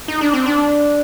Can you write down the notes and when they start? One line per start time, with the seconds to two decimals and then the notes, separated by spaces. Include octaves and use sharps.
0.08 D#4
0.21 D4
0.33 C4
0.46 D4